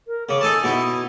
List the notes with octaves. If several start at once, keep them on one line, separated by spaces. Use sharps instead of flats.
A#4
C#3 D6
D#4 A4 G#5 A5
B2 D#4 E4